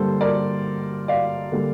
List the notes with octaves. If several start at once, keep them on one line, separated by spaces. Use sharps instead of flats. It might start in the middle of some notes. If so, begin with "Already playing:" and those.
Already playing: G2 D3 G3 A#3 A4 C5
A#4 D5
D5 F5
D3 G3 A#3